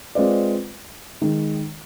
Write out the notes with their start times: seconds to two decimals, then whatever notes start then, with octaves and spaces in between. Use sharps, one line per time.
0.15 G#3 C4 F4 B4 D5
1.22 D#3 G#3